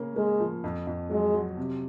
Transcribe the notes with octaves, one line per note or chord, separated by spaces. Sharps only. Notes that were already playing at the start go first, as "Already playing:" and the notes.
Already playing: C#3 A#3 C#4
G#3 A#3
F3
F2
F2
F#3 G#3
F#3
C3